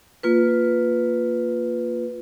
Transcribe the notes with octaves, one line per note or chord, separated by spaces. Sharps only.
A#3 F4 B4